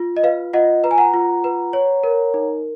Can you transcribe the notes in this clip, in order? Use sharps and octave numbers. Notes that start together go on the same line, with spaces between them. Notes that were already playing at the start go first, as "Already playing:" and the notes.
Already playing: F4
D#5
B4 F5
F4 D#5 F#5
B4 A#5
G#5
F#5 A#5
F4
B4
C#5
A#4
D#4